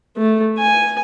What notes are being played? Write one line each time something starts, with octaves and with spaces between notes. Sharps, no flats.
A3
G#5